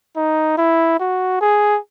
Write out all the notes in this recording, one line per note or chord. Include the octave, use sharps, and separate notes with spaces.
D#4
E4
F#4
G#4